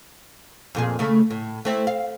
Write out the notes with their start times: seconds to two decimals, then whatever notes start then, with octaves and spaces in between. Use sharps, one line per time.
0.75 F2 A#2 G#4
0.99 C#3 A3
1.31 A2
1.65 A3 C4 E4
1.87 F5